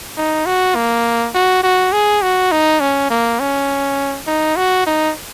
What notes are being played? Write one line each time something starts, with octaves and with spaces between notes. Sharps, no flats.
D#4
F#4
A#3
F#4
F#4
G#4
F#4
D#4
C#4
A#3
C#4
D#4
F#4
D#4